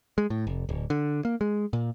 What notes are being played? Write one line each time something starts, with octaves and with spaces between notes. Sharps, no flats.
G#3
A2
F1
D1
D3
A#3
G#3
A#2